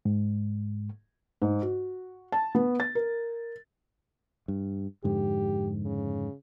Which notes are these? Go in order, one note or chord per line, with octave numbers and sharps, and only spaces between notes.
G#2
G#2
F#4
A5
B3
A6
A#4
G2
F2 G#2 D3 G4
C#3